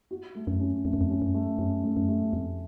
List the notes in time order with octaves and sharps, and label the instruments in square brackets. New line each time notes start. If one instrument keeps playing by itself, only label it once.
[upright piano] F#4
A3
[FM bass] F#2
[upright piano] C#4
[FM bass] F2 [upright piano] A3
[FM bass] F#2
F2
[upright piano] C#4
[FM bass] F#2
[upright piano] A3
[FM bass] F#2 [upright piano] C#4
[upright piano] A3
[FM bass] F#2
[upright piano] A3
[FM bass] F2 [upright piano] A3